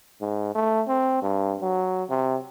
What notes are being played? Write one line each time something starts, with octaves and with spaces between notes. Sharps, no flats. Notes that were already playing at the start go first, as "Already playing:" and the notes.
G#2
A3
C4
G2
F#3
C3